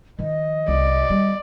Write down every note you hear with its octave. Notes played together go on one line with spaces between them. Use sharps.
D#3 F3 D#5
C2 D5
G3